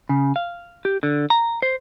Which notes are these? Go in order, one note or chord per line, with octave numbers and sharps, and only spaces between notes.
C#3
F5
G4
D3
A#5
C5